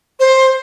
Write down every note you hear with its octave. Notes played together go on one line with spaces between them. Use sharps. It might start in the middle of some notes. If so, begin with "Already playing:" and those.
C5